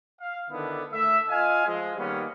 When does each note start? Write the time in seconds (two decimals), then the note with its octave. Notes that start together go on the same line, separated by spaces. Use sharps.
0.21 F5
0.51 D3 D#3 B3 D4 E4
0.92 A3 E5
1.29 F4 D#5 F5 G#5
1.66 F3 G#3
1.97 D#3 G3 A#3 B3 C#4